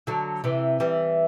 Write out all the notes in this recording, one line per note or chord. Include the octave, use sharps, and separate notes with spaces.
D3 F#3
C3 E3
E3 G3